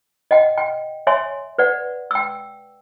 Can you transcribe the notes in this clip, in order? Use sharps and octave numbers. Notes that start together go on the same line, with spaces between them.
D#5 F#5 G5
G5
C#5 E5 G#5 C6
B4 D5 F#5
G5 E6